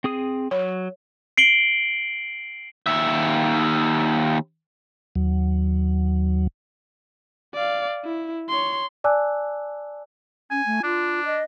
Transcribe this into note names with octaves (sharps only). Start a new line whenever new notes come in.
C4 G#4 D#6
F#3 C#5
C7 D7 F#7 G7
D#2 E5
D#2 F#3
D5 F5
E4
C#5 C6
D5 G#5 A5 D6 E6 F#6
C#4 G#5
A3
D4 F4
D#5